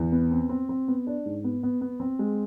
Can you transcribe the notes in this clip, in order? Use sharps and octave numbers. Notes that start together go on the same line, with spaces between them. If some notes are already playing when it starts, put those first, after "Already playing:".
Already playing: E2
B3
C4
C4
C4
B3
D4
G#2
B3
B3
B3
C4
G#3